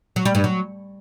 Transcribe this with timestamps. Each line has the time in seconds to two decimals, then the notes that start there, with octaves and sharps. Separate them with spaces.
0.16 F#3
0.25 G3
0.35 G2
0.44 F#3